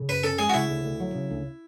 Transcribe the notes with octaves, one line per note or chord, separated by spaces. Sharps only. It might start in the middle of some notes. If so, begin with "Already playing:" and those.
Already playing: C#3
F#2 B4
C#4 A4
G#3 G#4
F#4
C#3 E4
D2
D2
F#3
C#3
D2